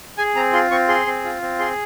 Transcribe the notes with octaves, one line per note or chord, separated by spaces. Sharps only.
G#4 G#5
C4 A#5
F4 C6
C4 C#6
G#4 C6
C4
F4
C4
G#4 C6